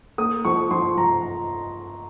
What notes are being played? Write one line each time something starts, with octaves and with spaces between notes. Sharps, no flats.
A#3 D#6
F3 C#6
F3 C6
F3 A#5